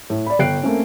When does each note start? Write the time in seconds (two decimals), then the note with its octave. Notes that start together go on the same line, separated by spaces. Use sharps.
0.10 A2
0.26 D5 B5
0.39 G1 G5 F#6 C7 D7
0.63 A3 A#3 C4 C#4